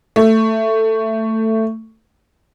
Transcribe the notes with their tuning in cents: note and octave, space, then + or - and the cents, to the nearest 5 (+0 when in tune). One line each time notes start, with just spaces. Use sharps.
A3 +15